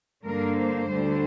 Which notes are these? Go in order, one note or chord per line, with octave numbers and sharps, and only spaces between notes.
G2 D3 A#3 A#4
C5
D2 D3 G3